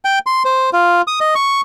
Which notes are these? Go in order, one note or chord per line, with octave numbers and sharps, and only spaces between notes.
G5
C6
C5
F4
D#6
D#5
C#6